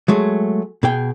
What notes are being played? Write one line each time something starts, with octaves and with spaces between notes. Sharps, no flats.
F#3 G#3 A3
B2 G#4 G5